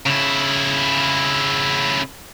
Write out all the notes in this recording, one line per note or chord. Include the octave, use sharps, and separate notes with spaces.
C#3 E4